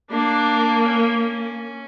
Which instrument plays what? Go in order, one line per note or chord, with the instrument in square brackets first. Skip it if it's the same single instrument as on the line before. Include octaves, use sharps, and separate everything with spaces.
[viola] A#3 [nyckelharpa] D4
[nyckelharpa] C#4